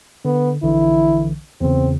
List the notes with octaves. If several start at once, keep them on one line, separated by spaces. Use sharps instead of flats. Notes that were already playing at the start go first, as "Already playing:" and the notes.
D3 B3
A#1 D3 E3 E4
E2 C#3 C4